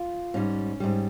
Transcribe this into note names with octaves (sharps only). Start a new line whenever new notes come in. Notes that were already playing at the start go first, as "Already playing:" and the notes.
Already playing: F4
G#2 G3 C#4
G#2 G3